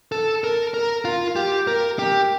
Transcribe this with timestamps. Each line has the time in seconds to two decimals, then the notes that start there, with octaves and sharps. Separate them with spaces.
0.12 A4
0.44 A#4
0.74 A#4
1.05 F4
1.36 G4
1.67 A#4
1.99 G4